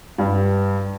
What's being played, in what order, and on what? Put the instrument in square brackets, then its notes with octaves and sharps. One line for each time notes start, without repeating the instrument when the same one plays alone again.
[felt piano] G2